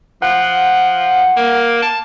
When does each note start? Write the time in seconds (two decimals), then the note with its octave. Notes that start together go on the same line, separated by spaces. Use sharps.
0.22 F3 F#5
1.36 A#3
1.82 A5